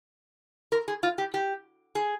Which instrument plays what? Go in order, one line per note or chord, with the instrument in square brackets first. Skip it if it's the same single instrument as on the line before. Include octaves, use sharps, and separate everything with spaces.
[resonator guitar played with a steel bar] A#4
G#4
F4
G4
G4
G#4